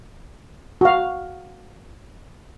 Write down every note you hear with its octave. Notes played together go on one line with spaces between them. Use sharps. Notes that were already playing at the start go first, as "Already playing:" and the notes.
F#4 F5